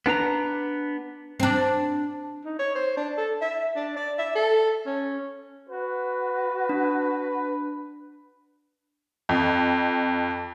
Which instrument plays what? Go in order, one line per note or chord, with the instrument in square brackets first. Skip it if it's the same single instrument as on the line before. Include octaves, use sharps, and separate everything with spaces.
[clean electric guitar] B3 D4 B4 A#5
[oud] C4 D4
[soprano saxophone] D#4
C#5
C5
D4
A4
E5
D4
D5
E5
A4
C#4
[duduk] F#4 [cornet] B4
[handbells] D4
[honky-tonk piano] F2